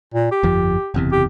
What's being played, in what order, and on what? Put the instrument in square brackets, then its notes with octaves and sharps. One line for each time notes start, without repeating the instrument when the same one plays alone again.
[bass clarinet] A#2
G4
[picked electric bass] G1 F2 F3
F#1 E2 C3
[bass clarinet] G4